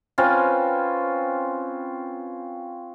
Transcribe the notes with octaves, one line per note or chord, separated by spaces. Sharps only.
C4 C#4 F4 B4